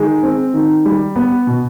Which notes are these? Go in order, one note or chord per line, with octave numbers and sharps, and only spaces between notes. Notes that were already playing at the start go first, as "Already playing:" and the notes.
Already playing: D#3 G#3
C4
D#3
G3
B3
B2